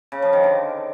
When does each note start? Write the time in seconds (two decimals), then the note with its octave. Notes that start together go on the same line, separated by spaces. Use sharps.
0.12 C#3
0.22 F3
0.33 D#3
0.43 D3